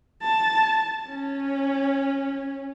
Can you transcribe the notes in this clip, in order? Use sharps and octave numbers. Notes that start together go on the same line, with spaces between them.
A5
C#4